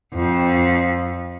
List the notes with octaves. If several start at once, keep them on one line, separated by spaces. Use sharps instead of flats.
F2